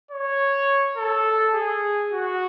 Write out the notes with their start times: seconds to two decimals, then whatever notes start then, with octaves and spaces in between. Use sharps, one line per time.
0.11 C#5
0.97 A4
1.55 G#4
2.12 F#4